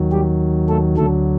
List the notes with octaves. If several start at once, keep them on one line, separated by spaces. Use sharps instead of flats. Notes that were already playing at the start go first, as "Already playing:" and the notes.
Already playing: D#2 D#3 F#3
G3 G4
A3 A4
D2 D3 F#3 A3 A4